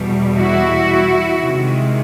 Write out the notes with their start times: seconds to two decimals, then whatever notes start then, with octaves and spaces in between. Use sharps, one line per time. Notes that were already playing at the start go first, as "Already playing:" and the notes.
Already playing: E2 B2 G3
0.38 E4 F#4
1.35 C3 D#3 G#3